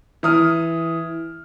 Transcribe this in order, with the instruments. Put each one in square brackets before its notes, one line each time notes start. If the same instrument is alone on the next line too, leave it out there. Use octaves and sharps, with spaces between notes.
[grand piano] E3 D#6 F6